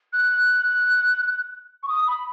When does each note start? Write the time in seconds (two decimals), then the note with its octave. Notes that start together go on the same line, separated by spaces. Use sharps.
0.13 F#6
1.83 C#6
1.88 D#6
2.07 B5